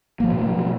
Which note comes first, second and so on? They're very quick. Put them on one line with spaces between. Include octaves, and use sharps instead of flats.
A#3 F3 F#3 B2